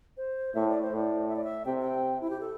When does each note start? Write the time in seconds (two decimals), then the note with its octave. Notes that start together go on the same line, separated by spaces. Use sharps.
0.17 C5
0.54 A2 E5
0.68 D5
0.82 C5
0.91 A2 D5
1.29 E5
1.36 D5
1.44 E5
1.65 C3 G5
1.81 G5
2.21 E4
2.30 G4
2.40 A4